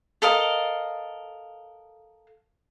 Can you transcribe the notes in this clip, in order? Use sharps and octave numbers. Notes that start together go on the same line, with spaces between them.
A4 A#4 D#5 F5